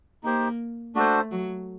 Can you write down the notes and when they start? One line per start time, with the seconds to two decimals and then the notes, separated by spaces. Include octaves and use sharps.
0.23 A#3 D#4 G4 C5
0.95 A3 D4 F#4 A4 C5
1.31 F#3